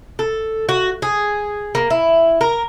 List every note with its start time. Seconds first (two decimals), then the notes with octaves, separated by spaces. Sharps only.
0.19 A4
0.69 F#4
1.02 G#4
1.75 A#3
1.90 E4
2.41 A#4